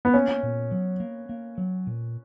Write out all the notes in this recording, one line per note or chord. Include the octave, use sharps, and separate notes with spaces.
B3
A#3 C#4
A#2
F#3
A#3
A#3
F#3
A#2